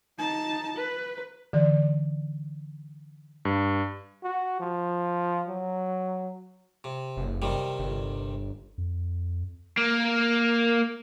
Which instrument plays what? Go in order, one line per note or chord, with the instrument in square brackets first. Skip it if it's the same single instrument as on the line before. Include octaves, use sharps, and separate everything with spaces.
[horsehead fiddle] D#4 A5
B4
[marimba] D3 E3 D5
[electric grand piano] G2
[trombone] F#4
F3
F#3
[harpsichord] C3
[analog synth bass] F#1
[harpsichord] C3 D#3 G3
[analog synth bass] G1
[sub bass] F2
[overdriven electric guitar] A#3